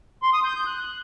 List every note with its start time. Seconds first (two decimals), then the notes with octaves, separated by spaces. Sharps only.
0.22 C6
0.33 D#6
0.44 G6
0.55 G6
0.66 F#6